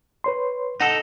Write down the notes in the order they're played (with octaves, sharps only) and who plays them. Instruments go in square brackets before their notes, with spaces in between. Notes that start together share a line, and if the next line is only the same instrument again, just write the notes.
[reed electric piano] B4 C#5 C6
[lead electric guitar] D#4 A4 [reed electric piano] F#5